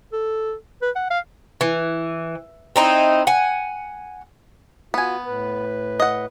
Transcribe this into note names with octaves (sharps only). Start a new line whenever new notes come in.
A4
B4
F#5
F5
E3
C4 D#4 E4
F#5 G#5
B3 F4 F#4 G#5
A2 B4
D#5 F#5